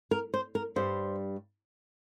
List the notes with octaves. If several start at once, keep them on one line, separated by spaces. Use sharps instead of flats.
A#4
C5
A#4
G2 G3 C5